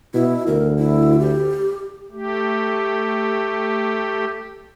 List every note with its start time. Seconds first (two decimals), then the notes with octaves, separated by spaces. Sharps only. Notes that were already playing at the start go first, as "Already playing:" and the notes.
0.14 B2 E4
0.47 D2 A#4
0.78 E4
1.20 G4
2.12 A3 G4